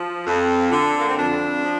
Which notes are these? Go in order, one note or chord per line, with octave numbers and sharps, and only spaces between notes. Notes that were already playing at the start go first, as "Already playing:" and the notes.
Already playing: F3
F2
D3
A#3
C4
F2 D4
F3